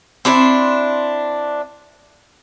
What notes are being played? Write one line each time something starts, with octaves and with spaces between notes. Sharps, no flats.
C4 D4 E4 C5